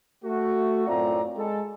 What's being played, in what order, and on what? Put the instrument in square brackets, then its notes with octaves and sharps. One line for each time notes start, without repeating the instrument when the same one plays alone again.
[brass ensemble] A3 F#4
F#2 A2 C4 F4 D5 A#5
G#3 A4